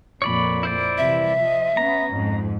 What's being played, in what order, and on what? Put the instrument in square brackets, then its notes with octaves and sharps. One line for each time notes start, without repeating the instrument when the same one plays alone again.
[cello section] F2 A#2 [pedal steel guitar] C#5 D5 B5
[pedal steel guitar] E4 C5 D5
[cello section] C3 E3 G3 [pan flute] E5
[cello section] F3 D#5
[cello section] B3 C#4 [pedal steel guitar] A#5
[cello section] F2 G#2